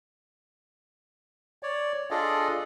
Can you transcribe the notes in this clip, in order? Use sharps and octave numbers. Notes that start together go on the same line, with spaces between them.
C#5 D5
D4 F4 G#4 A4 D5 D#5